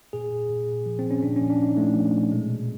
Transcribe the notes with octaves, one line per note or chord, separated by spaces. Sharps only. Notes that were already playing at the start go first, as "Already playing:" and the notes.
A#2 G#4
A#2
A#2
A#2
F3
C4
F3
C#4
A#2 D4
F3 C#4
D4
A#2 D#4
F3 A3
F3
A#2
B2 G#3
B2